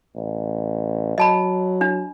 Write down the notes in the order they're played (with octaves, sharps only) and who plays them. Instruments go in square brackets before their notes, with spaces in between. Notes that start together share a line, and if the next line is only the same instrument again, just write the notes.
[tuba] A1
[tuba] F#3 [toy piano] D#5 A5 B5
[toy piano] D4